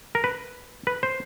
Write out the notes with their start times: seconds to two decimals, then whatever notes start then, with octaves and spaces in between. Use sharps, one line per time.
0.15 A#4
0.24 B4
0.87 B4
1.03 C5